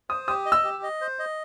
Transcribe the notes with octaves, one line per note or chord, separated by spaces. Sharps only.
C5 D#6
G4 D#6
D#5
E6
G4
D#5
C5
D#5